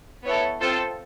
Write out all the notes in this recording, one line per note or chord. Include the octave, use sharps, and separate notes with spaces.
B3 E4 A4 C#5
C4 F4 A4 C5